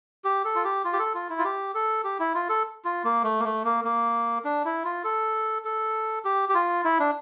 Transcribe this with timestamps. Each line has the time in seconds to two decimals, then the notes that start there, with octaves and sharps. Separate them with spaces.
0.24 G4
0.45 A4
0.55 F4
0.64 G4
0.85 F4
0.93 G4
0.99 A4
1.14 F4
1.30 E4
1.38 F4
1.45 G4
1.75 A4
2.04 G4
2.19 E4
2.34 F4
2.49 A4
2.85 F4
3.05 A#3
3.24 A3
3.40 A#3
3.45 A3
3.64 A#3
3.84 A#3
4.45 D4
4.65 E4
4.85 F4
5.04 A4
5.65 A4
6.25 G4
6.49 G4
6.55 F4
6.85 E4
7.00 D4